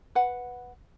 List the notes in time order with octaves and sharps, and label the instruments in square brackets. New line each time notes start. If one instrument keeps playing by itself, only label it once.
[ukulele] B4 F#5